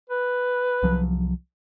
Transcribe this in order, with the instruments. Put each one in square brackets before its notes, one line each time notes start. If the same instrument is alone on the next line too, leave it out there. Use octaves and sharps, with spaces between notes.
[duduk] B4
[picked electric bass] C2 F3 F#3